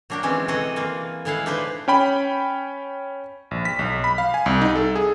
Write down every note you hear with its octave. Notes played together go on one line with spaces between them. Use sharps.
F#3 A#3 D4 F#4 G4
E3 G#3 C4 C#4
C3 E3 F#4 G#4 A4 D#5
E3 A#3 F4
A2 G#3 E4 G#4 F5 F#5
D4 D#4 B4 C5
C#4 G5 B5
A#1
B6
B1
B5
F5
G#5
C2
D#4
A4
G#4